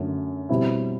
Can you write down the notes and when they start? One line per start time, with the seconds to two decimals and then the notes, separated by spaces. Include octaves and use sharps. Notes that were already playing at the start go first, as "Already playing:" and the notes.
Already playing: F#2 D3 A3
0.49 B2 G3 C4 E4